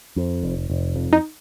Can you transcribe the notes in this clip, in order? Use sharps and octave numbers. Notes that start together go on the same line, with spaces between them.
F2
F1
F1
F2
D#4